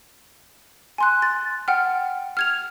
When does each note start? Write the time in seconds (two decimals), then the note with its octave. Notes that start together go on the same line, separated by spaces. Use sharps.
0.98 G#5 C6 F#6
1.22 A6
1.68 F#5 G5 F6
2.37 F6 G#6 F7